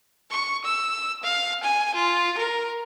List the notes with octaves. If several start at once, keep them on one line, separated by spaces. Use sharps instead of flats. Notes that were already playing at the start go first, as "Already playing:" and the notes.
C#6
E6
F5
G#5
F4
A#4